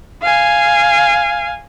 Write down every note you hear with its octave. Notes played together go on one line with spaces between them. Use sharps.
F5 G#5